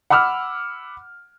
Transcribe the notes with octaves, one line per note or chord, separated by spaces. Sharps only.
F#5 B5 D6 E6 F6